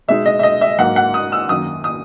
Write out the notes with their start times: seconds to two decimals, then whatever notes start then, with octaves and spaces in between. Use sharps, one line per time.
0.08 B2 G#3 D#4 E5
0.26 D#5
0.39 E5
0.43 D#5
0.61 E5
0.79 G#2 F#3 A#3 F#5
0.96 F#5
1.14 D#6
1.32 E6
1.49 F#2 D#3 A#3 D#6
1.84 D#6